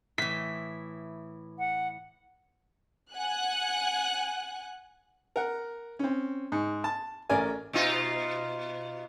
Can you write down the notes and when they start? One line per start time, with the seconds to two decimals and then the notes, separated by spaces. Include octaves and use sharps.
0.18 A2 E3 B6
1.58 F#5
3.13 F#5 G#5 F#6
5.36 A#4 F#5
5.99 C4 C#4
6.52 G#2
6.84 A5
7.30 A1 C#4 A#4 D5 G#5
7.73 B2 D#4 F4